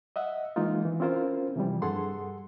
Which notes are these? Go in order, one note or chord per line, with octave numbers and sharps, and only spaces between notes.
D#5 E5 F#5
E3 G#3 A#3 D#4 F4
E3
C4 C#4 E4 F4 A#4 C5
C3 E3 F3 G3
G2 G#4 A4 F#5 C6